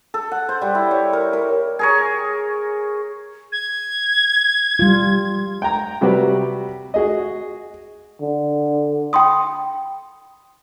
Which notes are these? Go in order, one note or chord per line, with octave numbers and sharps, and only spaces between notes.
A4
F#5
C5
G3
E4
C#5
A#4
A#4
G#4 A#4 C#5
G#6
G3 F4
G5 A#5
C3 G3 F#4 G4 B4
F#4 G#4 D#5
D3
G5 B5 C6 D#6